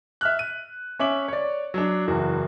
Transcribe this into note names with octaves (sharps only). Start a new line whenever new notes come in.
E5 F6 F#6
D#7
C#4 C#5 E5 D6 F#7
C#5 D5
F#3 D4
F#1 E2 F#4